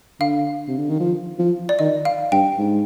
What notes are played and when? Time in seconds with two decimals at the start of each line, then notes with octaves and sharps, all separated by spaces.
0.20 D3 F5
0.68 C3
0.78 D3
0.89 D#3
1.00 F3
1.39 F3
1.69 D5
1.79 D#3 D#5
2.05 F5
2.32 G2 G5
2.58 G#2